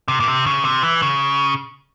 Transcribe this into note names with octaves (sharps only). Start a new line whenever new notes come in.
C3
A#2
C3
C#3
C3
E3
C#3